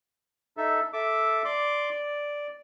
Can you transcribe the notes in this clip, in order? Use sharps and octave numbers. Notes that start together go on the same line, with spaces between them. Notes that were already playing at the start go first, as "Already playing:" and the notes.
D#4 A4 E5
A4 E5 D6
D5 C6 D6
D5